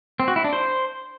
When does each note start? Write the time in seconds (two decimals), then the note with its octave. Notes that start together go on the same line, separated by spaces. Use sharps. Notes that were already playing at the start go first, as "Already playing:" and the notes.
0.20 C4
0.28 F#4
0.36 E4
0.44 D4
0.53 C5